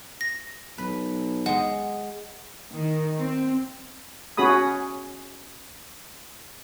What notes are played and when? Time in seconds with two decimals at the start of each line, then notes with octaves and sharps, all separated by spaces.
0.21 A#6
0.78 B1 B4
1.46 G#3 D#5 F#5
2.73 D#3
3.19 C4
4.37 C#4 F#4 G#4 B5 D#6